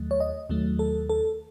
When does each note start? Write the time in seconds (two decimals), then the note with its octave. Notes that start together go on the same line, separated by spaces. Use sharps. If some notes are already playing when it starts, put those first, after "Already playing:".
Already playing: D#2 D#3 F#3 A3
0.11 C#5
0.20 D#5
0.50 D#2 D#3 F#3 A3
0.79 A4
1.10 A4